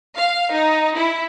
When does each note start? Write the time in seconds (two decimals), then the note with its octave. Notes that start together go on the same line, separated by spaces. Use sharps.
0.17 F5
0.52 D#4
0.96 E4